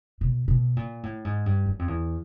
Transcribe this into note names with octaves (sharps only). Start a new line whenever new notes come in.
B2
B2
A#2
A2
G#2
G2
F#2
F2
E2